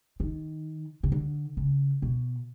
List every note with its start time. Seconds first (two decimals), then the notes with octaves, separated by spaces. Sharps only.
0.20 D#3
1.03 C#3
1.12 D3
1.57 C#3
2.02 B2